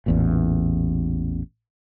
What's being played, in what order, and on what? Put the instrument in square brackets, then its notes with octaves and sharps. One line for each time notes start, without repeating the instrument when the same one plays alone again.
[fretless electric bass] A1 E2 A#2